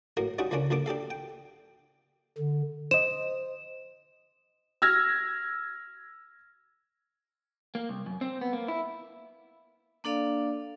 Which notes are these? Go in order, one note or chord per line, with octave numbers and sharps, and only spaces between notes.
A2 F#3 A#3 A#4
G3 C#4 D#4 F4 F#4
C#2 D3 F3 A#3 C#4 D4
A#1 A#2 D3 D4 D6
D4 G4 A4 F5
G5
D3
C5 D#5 E7
E6 F6 G#6 A#6
A#3
C2
F#2
C4
B3
A#3
E4
A#3 D4 A4 D5 F5